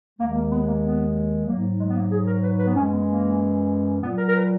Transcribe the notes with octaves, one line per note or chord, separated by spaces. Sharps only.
D#2 D#3 G#3 A#3
A#3
B3
A#3
B3
G#2 F#3 A#3
G#3
B3
A#3
G#4
A#4
B4
B4
B3
F#2 E3 G#3 C#4
B3
A#3
A#2 F#3 B3
A#4
A#4
B4